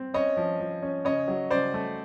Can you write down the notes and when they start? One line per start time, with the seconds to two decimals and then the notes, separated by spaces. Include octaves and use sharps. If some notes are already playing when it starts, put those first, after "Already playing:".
Already playing: C4
0.14 C#4 C#5 D#5
0.37 F3
0.60 F3
0.83 C#4
1.05 C#3 C#5 D#5
1.28 F#3
1.50 C#3 C5 D5
1.74 A3